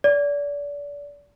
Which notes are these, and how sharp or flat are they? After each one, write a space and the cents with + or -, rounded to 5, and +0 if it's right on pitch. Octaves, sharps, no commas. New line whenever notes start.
D5 -30